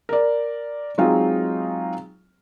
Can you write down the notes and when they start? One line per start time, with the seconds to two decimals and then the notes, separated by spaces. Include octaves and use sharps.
0.09 A#4 D5
0.98 F#3 G#3 C4 D#4 F4